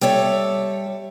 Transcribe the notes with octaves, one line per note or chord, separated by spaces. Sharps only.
G3 A4 C#5 E5